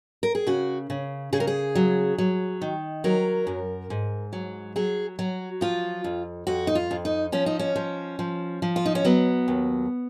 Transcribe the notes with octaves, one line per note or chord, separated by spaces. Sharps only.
A#4
G#4
C#3 F#4
C#3
C#3 G#4
A#4
G#4
F#3
F#3
D#3
F#3 A#4
F#2
G#2
F#3
F#3 G#4
F#3 F#4
F3 F4
F2
F2 F#4
D#4
F4
F2
D#4
F3 C#4
D#4
C#4
F3
F3
F3
F4
D#4
C#4
F#3 B3
D#2